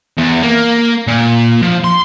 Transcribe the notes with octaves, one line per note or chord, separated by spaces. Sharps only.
E2
A#3
A#2
F3
C6